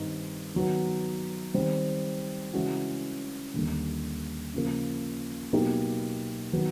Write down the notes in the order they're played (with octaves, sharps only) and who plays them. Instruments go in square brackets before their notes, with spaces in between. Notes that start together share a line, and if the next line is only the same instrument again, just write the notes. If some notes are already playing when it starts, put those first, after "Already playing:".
Already playing: [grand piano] G2 D#3 G3 C4 D#4
D#3 F#3 B3
D#3 G3 C4
C#3 E3 G#3 C#4 F#4
D#2 D3 G3
C#3 F3 A#3
B2 F#3 A#3 D#4 G4
D#3 F#3 B3